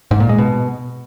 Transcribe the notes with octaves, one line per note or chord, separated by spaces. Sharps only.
G#2
A#2
G#3
B2